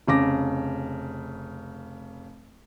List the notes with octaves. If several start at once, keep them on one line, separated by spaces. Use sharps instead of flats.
F1 C#3 D6 A#6